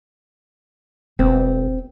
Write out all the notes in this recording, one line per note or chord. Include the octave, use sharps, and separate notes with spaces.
E1 C4